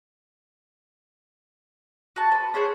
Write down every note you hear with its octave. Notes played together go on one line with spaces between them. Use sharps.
F#4 A5
B4 C5
C#4 G#4 C5 F#5